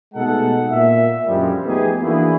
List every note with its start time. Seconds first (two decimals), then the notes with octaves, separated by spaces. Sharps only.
0.14 B2 G#3 A3 D#4 A4 F#5
0.69 A#2 E5
1.26 F#2 A#2 D3 F3 G3 G#3
1.65 F3 A3 B3 D#4 G4 G#4
2.01 E3 A#3 D4 E4 F#4 G#4